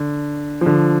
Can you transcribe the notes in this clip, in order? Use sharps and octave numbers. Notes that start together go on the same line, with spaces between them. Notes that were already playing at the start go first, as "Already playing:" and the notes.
Already playing: D3
F3
D3